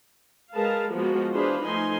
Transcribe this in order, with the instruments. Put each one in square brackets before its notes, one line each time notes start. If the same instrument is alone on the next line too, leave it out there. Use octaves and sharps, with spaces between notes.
[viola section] G#3 A#4 B4 F5 A5
F3 G#3 A#3 B3 F#4
E3 D4 G#4 B4 C5 F5
F3 A3 D#4 G#5 C6